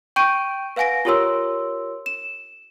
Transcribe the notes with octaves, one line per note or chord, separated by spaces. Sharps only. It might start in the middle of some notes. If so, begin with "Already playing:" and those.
G5 C#6 G6 D7 D#7
B4 F5 F#5 G#5 A#6 D7
F4 G4 A#4 C#5 C6 E6
E7